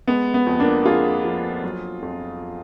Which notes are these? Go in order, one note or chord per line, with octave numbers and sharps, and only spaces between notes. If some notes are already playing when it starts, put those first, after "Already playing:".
G#3 B3
B3
F2
A#3 D4
F2 F4 G#4
F3
F#3
F2